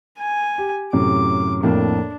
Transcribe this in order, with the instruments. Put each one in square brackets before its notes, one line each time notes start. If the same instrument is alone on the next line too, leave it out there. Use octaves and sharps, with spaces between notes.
[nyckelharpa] G#5
[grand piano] G4
[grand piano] F#2 A2 C3 [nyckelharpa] D6
[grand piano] F2 A2 A#3 [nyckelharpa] D4